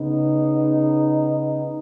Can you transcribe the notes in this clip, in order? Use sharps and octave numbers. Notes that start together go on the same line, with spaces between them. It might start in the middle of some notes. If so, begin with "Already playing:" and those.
Already playing: C#3 B3 D#4